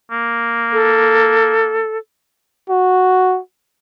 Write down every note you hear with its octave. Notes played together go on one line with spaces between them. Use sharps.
A#3
A4
F#4